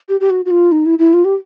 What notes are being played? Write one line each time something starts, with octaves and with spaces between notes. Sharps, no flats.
G4
G4
F#4
F#4
F4
D#4
E4
E4
F4
G4